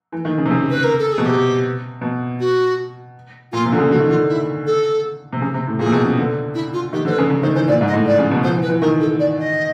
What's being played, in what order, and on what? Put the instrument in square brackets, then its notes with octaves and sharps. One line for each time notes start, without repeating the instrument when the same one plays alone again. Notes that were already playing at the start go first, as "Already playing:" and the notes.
[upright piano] E3
D#3
C#3
C3
C#3
[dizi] B4
A#4
A4
G#4
[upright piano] B2
[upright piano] C3 [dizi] G4
[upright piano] B2
[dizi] F#4
[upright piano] A#2 [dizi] F4
[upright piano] C3
D3
C#3
[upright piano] D3 [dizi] F#4
[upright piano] D#3
[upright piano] D3 [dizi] F4
[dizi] E4
A4
[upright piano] C3
C#3
C3
A2
[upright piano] A#2 [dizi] G#4
[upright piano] C3
B2
C#3
D3
[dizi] E4
F4
[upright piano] D#3 [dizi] G4
[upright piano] D3 [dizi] C5
[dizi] B4
[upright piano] C#3
C#3
[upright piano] D#3 [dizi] C5
[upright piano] E3 [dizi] C5
[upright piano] A#2 [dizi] D5
[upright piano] G#2
[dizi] D#5
[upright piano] A2
[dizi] D5
[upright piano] C#3
B2
[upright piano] F3 [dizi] C5
[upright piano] E3
[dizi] B4
[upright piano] E3
[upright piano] D#3 [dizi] A#4
[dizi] A4
D5
D#5